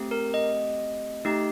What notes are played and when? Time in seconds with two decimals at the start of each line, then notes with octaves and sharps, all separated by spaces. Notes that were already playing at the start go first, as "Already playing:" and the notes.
Already playing: A3 C4 G4
0.11 A#4
0.34 D#5
1.25 A3 D#4 G4